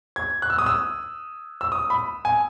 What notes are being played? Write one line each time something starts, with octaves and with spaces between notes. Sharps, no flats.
G#6
F#6
E6
D#6
E6
E6
D#6
B5
G#5